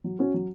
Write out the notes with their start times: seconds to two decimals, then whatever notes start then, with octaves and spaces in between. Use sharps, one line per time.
0.04 F#3
0.19 C#4 F#4
0.34 F#3